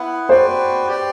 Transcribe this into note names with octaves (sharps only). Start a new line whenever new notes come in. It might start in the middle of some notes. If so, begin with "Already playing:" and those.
Already playing: B3 E4 B4 F#5
F#4 B4 C5 D5 G5
G4 D5 G5